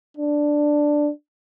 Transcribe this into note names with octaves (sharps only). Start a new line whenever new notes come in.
D4